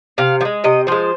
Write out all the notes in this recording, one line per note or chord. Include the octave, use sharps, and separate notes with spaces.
C3 F5
F3
G#3
C3 D#5
F3 G#3 C5